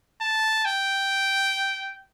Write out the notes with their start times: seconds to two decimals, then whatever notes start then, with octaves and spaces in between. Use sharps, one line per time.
0.21 A5
0.65 G5